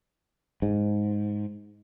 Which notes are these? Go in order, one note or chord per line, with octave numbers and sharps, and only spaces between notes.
G#2